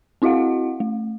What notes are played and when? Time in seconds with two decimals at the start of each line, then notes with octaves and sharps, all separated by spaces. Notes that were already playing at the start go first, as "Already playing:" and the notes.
0.22 C4 E4 F#4 D#5 F5 F#5
0.80 A3